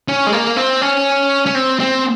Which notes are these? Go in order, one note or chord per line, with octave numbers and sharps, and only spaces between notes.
C#4
G#3
A#3
C4
C#4
C#4
C4
C4